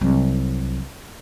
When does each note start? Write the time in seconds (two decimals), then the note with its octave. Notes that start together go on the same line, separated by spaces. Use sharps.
0.01 C2 F#3